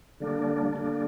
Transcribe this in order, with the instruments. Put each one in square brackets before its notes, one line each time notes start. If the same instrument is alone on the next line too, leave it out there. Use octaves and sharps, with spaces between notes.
[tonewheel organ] D3 G3 A#3 D4
D3 G3 A#3 D4